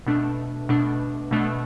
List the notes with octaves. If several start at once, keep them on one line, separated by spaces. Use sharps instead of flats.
B2 A3 D4
B2 A3 D4
B2 A3 D4